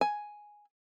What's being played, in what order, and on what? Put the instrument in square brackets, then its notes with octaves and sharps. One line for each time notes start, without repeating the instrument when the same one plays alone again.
[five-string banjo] G#5